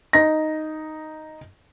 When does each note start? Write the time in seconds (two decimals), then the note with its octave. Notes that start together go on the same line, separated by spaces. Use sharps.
0.13 D#4 A#6